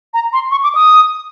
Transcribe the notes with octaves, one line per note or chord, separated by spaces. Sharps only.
A#5
C6
C#6
D6
D#6